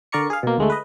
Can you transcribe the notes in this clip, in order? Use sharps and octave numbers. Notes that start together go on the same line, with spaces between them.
D3 A#4 D5 A#5 C#6 C#7
G#4 F5
B2 A#3
D2 G#3 A3
B4 D#5